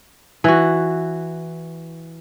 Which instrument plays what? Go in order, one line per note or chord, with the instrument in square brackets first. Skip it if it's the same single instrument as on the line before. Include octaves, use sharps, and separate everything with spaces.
[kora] E3 F#4